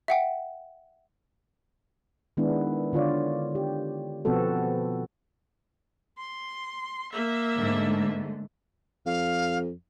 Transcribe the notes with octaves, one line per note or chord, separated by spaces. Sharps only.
E5 F#5 G5
D#3 G#3 B3 D4 E4
D3 F4 C#5 D5
G4
B2 F3 B3 C4 F#4 A4
C6
A#3 E5
G#2 D3 A3
F2 F5